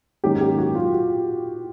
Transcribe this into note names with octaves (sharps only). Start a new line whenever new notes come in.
G#2 D#3 F#3 A#3 C#4 G4
G4
F#4
F4
F#4